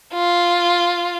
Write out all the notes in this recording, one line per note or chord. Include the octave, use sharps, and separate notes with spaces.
F4